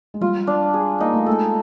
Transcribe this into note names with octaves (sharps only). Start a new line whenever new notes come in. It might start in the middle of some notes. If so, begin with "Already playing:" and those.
G#3
G3 F4
D4
G#4
A#3 D#4
A3
G#3 A4